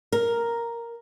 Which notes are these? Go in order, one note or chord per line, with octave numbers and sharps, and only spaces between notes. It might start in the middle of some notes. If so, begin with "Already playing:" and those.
A#4